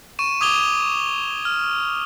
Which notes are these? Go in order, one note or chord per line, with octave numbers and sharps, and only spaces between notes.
C#6 D#7 E7
D6 D#6 G#6 F7 G7
F6